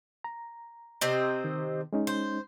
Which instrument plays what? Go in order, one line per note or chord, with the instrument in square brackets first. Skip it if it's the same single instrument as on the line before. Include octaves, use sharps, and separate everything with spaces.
[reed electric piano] A#5
[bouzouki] C3 C4 D#5
[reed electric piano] D#3
G#3 C#4 D#4
[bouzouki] C5